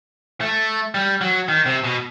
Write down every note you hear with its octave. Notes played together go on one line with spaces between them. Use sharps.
A3
G3
F#3
D#3
C3
B2